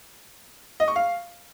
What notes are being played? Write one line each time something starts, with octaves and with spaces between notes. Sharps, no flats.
D#5
C#6
F5